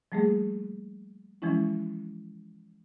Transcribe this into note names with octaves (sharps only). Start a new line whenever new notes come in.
F3 G3 A3 A#3 G#4
E3 F3 G#3 C#4 E4